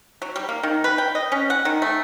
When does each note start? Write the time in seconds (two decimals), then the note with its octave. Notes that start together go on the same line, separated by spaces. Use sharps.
0.22 F#3
0.36 G3
0.49 A#3
0.63 D#3
0.84 B4
0.98 G5
1.15 D#5
1.32 C#4
1.50 F#5
1.65 D#3
1.82 A3